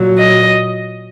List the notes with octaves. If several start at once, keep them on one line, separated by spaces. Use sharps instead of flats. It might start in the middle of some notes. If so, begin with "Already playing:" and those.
Already playing: A#2 F#3
D#5